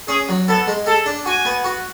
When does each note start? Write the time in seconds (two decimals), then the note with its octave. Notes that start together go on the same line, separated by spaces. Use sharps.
0.08 C#4 G#4
0.29 F#3
0.48 B3 A4
0.68 G#3
0.86 G#4 A4
1.06 D4
1.25 F#4 G#5
1.45 B3
1.64 F#4